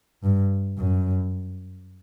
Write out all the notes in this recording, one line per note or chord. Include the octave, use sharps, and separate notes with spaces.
G2
F#2